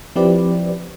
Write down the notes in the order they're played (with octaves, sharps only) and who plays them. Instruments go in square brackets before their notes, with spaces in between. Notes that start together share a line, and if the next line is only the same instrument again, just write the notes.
[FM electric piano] F3 C4 E4 G4 B4 D5